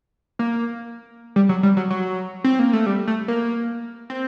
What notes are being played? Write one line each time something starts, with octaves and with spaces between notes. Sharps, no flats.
A#3
G3
F#3
G3
F#3
F#3
C4
A#3
A3
G3
A3
A#3
C4